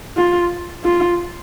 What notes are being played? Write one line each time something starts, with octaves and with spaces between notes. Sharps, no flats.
F4
F4